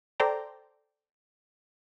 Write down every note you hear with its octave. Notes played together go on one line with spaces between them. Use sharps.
A4 C5 D5 G5 A#5